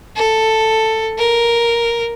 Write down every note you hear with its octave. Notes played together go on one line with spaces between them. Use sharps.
A4
A#4